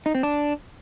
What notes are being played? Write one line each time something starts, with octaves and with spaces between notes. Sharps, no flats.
D#4
C4
D4